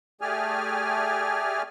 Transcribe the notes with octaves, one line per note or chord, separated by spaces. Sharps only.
A3 G4 G#4 D5 G#5 F6